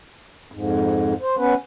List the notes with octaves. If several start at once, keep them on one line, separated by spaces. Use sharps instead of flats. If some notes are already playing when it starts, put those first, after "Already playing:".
F2 G#2
C5
B3 C#4 B4